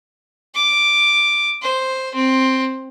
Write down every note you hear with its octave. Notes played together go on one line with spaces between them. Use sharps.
D6
C5
C4